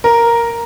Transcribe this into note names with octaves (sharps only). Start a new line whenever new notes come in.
A#4